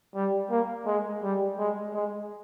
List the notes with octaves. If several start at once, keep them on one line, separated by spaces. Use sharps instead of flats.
G3
A#3
G#3
G3
G#3
G#3